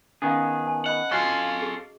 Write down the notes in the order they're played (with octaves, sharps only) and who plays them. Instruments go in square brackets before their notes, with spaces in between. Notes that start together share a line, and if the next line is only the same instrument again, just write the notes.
[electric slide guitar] D#3 B3 G#4 [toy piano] C#4 F5
[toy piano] G#5 A5
[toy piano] D#5 B5 [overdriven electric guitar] F#5
[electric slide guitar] C#4 F4 [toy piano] F#4 C#6 [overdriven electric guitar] A4 F5
[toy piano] G#4